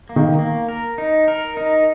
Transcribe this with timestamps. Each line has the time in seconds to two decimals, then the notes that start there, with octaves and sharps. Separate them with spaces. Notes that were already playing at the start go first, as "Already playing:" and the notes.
0.09 A#3
0.16 D#3
0.39 A#3
0.69 A#4
0.98 D#4
1.28 A#4
1.57 D#4